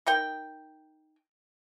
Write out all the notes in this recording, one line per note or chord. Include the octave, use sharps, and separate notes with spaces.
D#4 A#4 G5